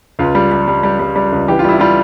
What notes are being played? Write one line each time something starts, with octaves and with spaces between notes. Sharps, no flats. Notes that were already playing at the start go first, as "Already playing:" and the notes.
C#2 F4
G3
G3
G3
G3
G3
G3
C#2
E3 G4
F4
G3 E4
G3 F4